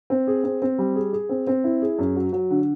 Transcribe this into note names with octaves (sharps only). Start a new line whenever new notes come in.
C4
G#4
C4
C4
G3
G#4
G#4
C4
C4
E4
G#4
F#2
F#3
F#3
D3